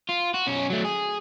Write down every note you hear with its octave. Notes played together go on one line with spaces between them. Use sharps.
F4
F#4
B1 C#4
F#3 A3
G#4